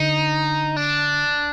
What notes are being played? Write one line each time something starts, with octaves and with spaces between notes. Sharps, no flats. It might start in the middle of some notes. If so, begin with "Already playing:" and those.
Already playing: D3 D#4
D4